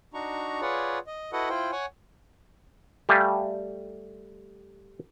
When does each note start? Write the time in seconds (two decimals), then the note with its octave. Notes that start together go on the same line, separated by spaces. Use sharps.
0.14 D4 D#4 F#4 A#5 C#6
0.61 F4 G#4 B4 C#5 D5 F#5
1.07 D#5
1.32 E4 F#4 A4 B4 D#5 F#5
1.49 E4 F4 C5 G5
1.72 C#5 F#5 G#5
3.09 G3 A3 G4 F5 G#5